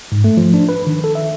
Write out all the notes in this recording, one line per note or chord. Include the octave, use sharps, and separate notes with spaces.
G#2
A3
F3
D4
B4
D#3
A4
E5